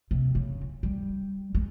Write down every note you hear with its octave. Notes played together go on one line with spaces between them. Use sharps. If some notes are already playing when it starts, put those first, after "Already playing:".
C3
C#3
G3
G#3